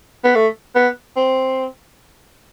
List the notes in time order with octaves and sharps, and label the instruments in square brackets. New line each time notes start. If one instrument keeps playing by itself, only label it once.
[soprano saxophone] B3
A3
B3
C4